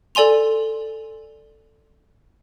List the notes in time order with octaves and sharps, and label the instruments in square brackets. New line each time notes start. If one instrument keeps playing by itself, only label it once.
[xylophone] A4 D5 G#5 C6 F7